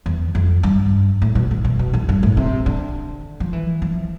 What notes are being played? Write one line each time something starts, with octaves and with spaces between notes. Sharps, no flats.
E2
F2
G2
A2
B2
A2
B2
B2
F2
G2
A2
C3
D3
F3
E3
F3